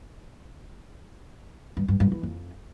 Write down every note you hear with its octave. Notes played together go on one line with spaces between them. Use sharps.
G2
G2
G2
E3
F2